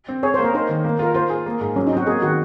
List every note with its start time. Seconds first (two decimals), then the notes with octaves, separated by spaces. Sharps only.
0.09 C4
0.23 G#4 C#5
0.34 A#3 C5
0.44 A#4
0.54 D#4 C5
0.69 D#3
0.84 A#3
0.99 F4 A#4
1.14 F4 C5
1.30 G#4
1.46 A#3
1.61 G#2
1.76 F#3 C#4
1.87 D#4
1.92 C4 F#4
2.07 A#3 G#4
2.22 D#3 F#4